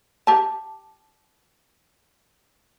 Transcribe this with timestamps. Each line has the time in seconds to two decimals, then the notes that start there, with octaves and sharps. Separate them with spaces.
0.27 G4 A5